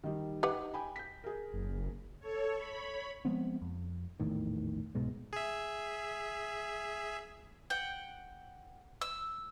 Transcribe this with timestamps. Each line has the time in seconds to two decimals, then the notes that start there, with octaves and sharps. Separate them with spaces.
0.04 D#3 G3
0.43 D#4 G4 B4 F#5
0.74 G5 G#5 B5
0.96 G6 B6
1.24 G#4 A#4
1.54 F#1
2.20 A4 C#5
2.56 C#5 B5
3.25 F3 G#3 B3 C4
3.62 F2
4.20 A#1 E2 A2 D#3
4.95 C2 G#2 B2 G#3
5.33 G#4 E5
7.70 F#5 G5
9.01 E6